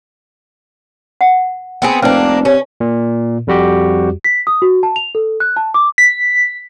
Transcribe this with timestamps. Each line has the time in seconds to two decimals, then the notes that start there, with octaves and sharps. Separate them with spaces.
1.21 F#5
1.82 B3 C4 G#4
2.02 F1 A#3 D4 B4 C5
2.45 C3 C#4
2.80 A#2
3.47 F2 G3 F#4 G4
4.24 B6
4.47 D#6
4.62 F#4
4.83 A5
4.96 F7
5.15 A4
5.40 F#6
5.57 A5
5.74 D6
5.98 B6